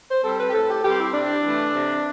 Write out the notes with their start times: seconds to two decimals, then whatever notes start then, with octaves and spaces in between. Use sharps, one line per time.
0.09 C5
0.23 G3 C4 A4
0.39 B4
0.49 G4
0.53 A2 A4
0.69 G4
0.84 G3 C4 G4
0.99 E4
1.13 C3 D4
1.44 E3 A3
1.74 C3